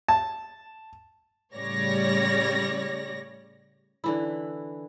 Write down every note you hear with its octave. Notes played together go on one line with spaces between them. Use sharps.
A5
A2 C#3 G3 C#5 D5 A#6
D3 E3 E4